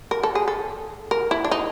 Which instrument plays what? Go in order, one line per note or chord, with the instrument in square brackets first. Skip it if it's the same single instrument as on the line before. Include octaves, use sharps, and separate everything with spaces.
[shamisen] A#4
A4
G#4
A4
A#4
E4
D4
D#4